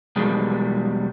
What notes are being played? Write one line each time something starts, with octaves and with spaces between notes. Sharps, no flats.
B1 E2 B2 D#3 G3 G#3